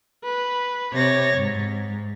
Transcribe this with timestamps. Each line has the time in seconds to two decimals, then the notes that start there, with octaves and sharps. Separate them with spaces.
0.23 B4
0.93 C3 C#5 A6 A#6
1.39 G#2